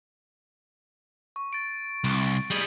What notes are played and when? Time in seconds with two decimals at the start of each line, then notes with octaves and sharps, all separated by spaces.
1.36 C#6
1.53 A6 D7
2.04 C2
2.51 G3 G#4 F#7